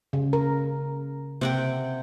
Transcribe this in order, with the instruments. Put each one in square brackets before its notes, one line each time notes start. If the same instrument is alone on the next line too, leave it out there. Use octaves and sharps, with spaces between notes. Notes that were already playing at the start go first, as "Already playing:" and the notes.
[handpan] C#3
A#4
[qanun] C3 F#5 G5